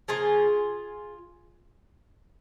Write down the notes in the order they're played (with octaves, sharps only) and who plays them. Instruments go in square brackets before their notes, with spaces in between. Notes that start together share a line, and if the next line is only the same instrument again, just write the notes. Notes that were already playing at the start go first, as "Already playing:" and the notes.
[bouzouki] C#3 F3 A#3 F4 G#4